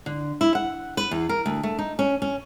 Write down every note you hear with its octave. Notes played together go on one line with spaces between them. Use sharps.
D3
E4
F#5
B4
E2
A#4
D2
A3
D#4
C#4
C#4